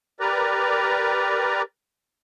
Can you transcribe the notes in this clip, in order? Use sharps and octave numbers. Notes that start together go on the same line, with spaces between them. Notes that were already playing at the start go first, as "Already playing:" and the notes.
G4 A#4 B4 D5 A#5